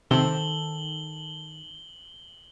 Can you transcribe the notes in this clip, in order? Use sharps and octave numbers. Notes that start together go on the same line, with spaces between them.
C3 D#3 A4 C5 F#7 G7